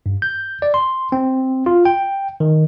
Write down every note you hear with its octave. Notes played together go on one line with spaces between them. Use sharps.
G2
G6
D5
C6
C4
F4
G5
D#3